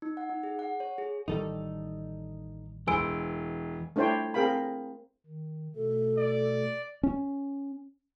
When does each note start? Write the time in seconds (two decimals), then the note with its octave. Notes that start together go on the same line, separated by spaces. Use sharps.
0.02 D#4
0.17 F#5
0.30 D#4
0.43 G#4
0.59 F#5
0.80 C#5
0.98 G#4
1.28 A1 D#3 G3 D#4 A4
2.87 E1 E3 C5 G#5 E6 D7
3.96 A3 D4 E4 C5 C#5 G5
4.34 C4 G#4 A#4 F5 G5 B5
5.26 D#3
5.76 B2 A3 A4
6.17 D5
7.03 C#4